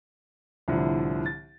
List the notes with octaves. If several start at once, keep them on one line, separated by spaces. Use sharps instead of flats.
C2 A2 D3 F3
A6